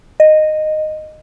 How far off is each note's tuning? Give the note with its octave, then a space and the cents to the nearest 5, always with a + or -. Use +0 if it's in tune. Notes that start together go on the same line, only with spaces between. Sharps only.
D#5 -10